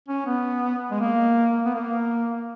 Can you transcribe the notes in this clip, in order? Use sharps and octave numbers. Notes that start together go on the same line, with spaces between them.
C#4
B3
G#3
A#3
B3
A#3